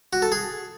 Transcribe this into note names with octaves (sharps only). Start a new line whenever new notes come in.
F#4
A4
G#4